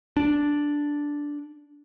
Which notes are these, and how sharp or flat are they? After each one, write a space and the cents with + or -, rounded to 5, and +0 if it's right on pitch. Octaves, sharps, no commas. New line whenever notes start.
D4 -5